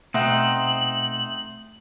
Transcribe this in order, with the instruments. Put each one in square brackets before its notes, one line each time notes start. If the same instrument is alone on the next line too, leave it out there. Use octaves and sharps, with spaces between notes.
[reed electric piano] B2 E5 F#5 [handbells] A3 [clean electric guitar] C4 D#4 [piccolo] F#7